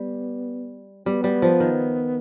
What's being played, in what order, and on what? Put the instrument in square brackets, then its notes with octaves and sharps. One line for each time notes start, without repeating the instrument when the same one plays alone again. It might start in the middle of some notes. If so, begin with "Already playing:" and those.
Already playing: [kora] G3 [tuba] B3
[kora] G3 [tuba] B3
[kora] G3
F3
D#3